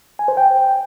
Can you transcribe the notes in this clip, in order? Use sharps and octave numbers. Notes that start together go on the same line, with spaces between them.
G#5
C5
G5